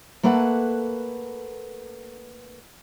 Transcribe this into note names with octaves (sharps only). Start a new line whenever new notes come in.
A3 A#3 A4 B4 F#5